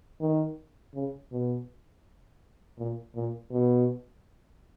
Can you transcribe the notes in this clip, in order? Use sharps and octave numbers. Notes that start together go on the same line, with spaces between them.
D#3
C#3
B2
A#2
A#2
B2